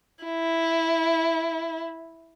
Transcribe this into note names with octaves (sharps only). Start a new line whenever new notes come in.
E4